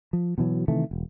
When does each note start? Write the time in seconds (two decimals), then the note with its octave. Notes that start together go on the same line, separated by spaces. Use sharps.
0.13 F3
0.38 B2 E3 F#3
0.68 C3 D#3 E3 A3
0.91 E1